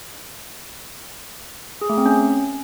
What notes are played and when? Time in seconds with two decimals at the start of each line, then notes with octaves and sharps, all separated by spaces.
1.81 G#4
1.90 A3
1.98 C4
2.06 C#4